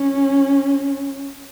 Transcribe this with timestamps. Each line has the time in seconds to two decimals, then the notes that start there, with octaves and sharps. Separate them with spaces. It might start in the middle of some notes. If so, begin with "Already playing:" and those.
Already playing: C#4